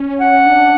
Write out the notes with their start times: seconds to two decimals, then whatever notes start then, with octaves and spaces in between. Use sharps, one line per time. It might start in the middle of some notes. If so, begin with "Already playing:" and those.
Already playing: C#4
0.20 F#5
0.46 D4